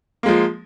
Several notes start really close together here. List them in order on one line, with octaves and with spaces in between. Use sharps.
A#3 G#3 F3